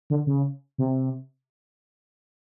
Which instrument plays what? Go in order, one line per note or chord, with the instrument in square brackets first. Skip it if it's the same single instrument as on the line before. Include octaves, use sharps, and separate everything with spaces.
[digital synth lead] D3
C#3
C3